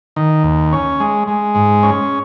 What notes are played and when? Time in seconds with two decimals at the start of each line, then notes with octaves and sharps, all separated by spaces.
0.16 D#3
0.44 D#2
0.72 C#4
1.00 G#3
1.28 G#3
1.55 G#2
1.83 C#4